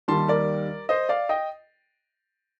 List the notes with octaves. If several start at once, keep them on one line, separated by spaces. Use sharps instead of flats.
D#2 D#3 G3 A5 C6
A#4 D5
C5 D#5
D5 F5
D#5 G5